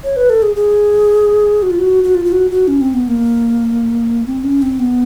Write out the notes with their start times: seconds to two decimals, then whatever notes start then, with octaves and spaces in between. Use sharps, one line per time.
0.04 C#5
0.16 B4
0.30 A4
0.42 G#4
0.56 G#4
1.62 F#4
1.70 F4
1.79 F#4
2.04 F#4
2.15 F4
2.25 F4
2.32 F#4
2.51 F#4
2.68 C#4
2.81 C4
2.94 B3
3.08 A#3
4.26 C4
4.44 C#4
4.62 C4
4.79 B3